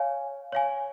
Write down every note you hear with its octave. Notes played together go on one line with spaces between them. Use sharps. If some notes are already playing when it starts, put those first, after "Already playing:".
Already playing: C#5 F5 G#5
C#5 F5 G#5